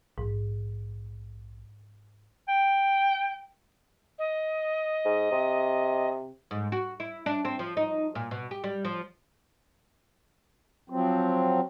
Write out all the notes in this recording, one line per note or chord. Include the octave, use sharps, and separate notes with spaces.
A#1 G#2
G5
D#5
G#2
C3
G#2
F#4
E4
D4
C4
F3
D#4
A#2
B2
G4
G3
F3
F3 F#3 C4